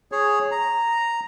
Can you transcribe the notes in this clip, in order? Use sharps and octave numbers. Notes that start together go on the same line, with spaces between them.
G#4 C#5
A#5